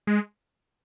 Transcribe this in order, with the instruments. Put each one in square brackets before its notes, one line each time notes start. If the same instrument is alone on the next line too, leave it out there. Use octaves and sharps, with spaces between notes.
[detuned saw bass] G#3